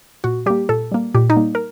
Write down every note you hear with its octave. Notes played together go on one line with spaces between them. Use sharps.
A#2 F#4
G3 A#3 G4
A#2 A4
G3 A#3
A#2 G4
D#4
G3 A#3
A#4